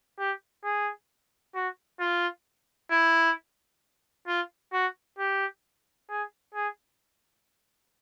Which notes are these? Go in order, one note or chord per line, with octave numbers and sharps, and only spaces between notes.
G4
G#4
F#4
F4
E4
F4
F#4
G4
G#4
G#4